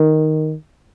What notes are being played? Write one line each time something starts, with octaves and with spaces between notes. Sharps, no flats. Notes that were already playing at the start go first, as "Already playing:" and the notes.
Already playing: D#3